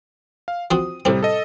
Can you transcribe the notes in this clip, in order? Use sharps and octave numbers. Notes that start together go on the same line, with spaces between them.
F5
F3 C4 F#4 D#6
A2 C3 G3 C4
A4 D#5